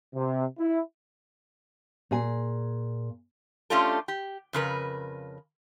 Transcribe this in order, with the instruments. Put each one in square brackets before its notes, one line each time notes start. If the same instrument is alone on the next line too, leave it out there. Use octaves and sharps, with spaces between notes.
[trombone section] C3
E4
[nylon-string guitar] A#2 G#4 G#5
[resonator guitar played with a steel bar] A3 C#4 D4 F4 G4 A4
G4
F2 C#3 A#4 B4